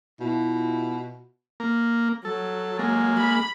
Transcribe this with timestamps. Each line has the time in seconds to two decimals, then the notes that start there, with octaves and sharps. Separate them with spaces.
0.20 B2 E4 F4
1.60 A#3
2.25 F#3 A4
2.79 G#3 A#3
3.19 B5